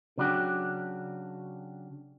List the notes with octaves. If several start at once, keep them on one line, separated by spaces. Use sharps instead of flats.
C#3 F#3 D4 F#4 G4